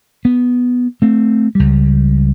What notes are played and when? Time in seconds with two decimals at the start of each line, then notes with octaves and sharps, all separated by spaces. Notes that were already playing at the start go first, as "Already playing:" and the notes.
0.25 B3
1.02 A3 C4
1.55 C#2 G3